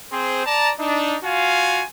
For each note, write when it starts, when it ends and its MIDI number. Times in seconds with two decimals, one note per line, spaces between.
0.12 0.46 60
0.12 0.46 68
0.12 0.46 72
0.46 0.71 74
0.46 0.71 81
0.46 0.71 82
0.80 1.17 62
0.80 1.17 63
1.24 1.85 65
1.24 1.85 66
1.24 1.85 77
1.24 1.85 80